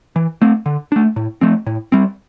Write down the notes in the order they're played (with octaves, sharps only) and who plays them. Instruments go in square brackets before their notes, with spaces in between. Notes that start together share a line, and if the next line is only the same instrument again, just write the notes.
[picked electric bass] E3
A3 C4
D3
A3 D4
A2
F3 A3 C4
A2
G3 C4